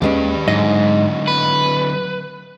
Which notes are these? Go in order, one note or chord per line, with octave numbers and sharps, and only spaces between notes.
D#2 G#3 C#4 G4 B4
G#2 D3 F#3 D#5
B4